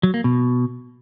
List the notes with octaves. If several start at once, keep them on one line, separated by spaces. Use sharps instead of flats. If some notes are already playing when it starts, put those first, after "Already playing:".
F#3
A#3
B2